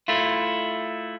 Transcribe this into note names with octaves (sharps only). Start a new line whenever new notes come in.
A3 E4 F4